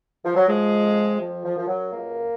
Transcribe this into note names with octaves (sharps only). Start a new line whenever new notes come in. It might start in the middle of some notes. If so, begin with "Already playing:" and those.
F3
F#3
F3 G#3
F2
F3
F3
F#2 F3
F#3
C#2 A#3